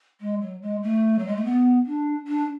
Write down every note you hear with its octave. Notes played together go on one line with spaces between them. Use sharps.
G#3
F#3
G#3
A3
F#3
G#3
A3
B3
D4
D4